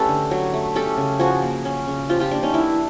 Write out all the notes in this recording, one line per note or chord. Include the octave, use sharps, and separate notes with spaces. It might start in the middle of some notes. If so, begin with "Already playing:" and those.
Already playing: A3 C#4 G4 A4 B4
D3
F#3
A3
C#4 G4 A4
C#3
F3 F#4 G#4
A#3
C#4
C#3
F3 F4 G4
F4 G4
A#3 D4
C#4 D#4
E3 D4 E4